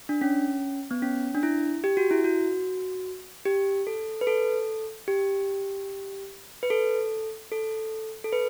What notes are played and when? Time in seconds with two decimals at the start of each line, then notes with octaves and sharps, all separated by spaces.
0.09 D4
0.21 C#4
0.91 B3
1.02 C#4
1.35 D4
1.43 E4
1.84 G4
1.97 F#4
2.11 E4
2.24 F#4
3.46 G4
3.87 A4
4.21 B4
4.27 A4
5.08 G4
6.63 B4
6.70 A4
7.52 A4
8.24 A4
8.33 B4